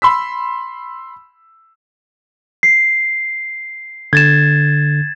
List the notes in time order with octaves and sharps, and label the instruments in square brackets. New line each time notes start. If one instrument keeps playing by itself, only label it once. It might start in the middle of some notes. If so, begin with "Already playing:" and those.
[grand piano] B5 C6 E6 B6
[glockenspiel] C7
[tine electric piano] D3 [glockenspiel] G#6 A6 E7